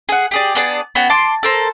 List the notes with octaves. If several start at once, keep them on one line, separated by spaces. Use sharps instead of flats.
G#4 F#5
G4 G#4 D5
B3 D4 G#4 D5
B3 C#4 F#4 G5
A5 C6 D6
A4 A#4 C5